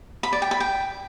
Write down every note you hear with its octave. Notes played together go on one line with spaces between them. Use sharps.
B5
D5
G5
B5
G5